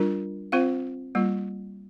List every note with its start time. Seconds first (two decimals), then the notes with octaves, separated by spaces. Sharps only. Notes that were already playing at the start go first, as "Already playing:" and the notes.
Already playing: G3 D4 F4 A#4
0.52 C4 F4 C5 F5
1.15 G3 A#3 F4